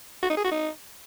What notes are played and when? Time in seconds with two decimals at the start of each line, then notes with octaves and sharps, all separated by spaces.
0.23 F#4
0.30 D#4
0.37 G#4
0.44 F#4
0.51 D#4